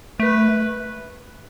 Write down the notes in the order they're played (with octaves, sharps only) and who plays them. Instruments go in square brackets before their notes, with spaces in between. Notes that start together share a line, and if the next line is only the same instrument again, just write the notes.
[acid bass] A3 [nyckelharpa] B4